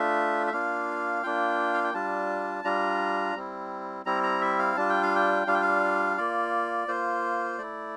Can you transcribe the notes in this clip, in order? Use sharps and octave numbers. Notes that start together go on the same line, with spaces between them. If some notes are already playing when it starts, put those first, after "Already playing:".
Already playing: A3 D4 F4 E5
E5
A#3 D4 F4 F5
A#3 D4 F4 G5
F5
G5
G3 D4 F4 A5
G3 D4 F4 A#5
G3 C4 E4
G3 C4 E4 A#5
A#5
E5
F5
G3 D4 F4 A5
G5
F5
G5
G3 D4 F4 F5
G5
F5
A#3 F4 D5
A#3 F4 C5
A3 E4 D5